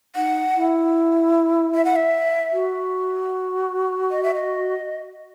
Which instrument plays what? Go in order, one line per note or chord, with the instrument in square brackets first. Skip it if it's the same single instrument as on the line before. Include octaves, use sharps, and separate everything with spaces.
[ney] D#4 [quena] F#5
[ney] E4
[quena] E5
F#5
E5
[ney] F#4
[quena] D#5
E5
D#5